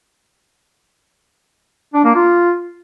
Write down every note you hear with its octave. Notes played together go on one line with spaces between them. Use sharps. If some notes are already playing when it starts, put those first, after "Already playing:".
D4
A#3
F4